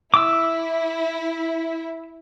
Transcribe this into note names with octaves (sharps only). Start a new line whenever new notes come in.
E4 D6 E6